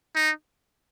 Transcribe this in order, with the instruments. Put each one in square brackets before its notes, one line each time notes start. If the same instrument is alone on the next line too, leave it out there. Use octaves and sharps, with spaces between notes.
[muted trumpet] D#4